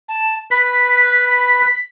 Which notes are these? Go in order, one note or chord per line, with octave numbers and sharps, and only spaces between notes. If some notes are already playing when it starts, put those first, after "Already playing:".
A5
B4 B6